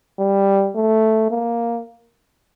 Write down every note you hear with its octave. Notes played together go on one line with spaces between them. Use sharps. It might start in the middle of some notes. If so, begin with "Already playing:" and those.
G3
A3
A#3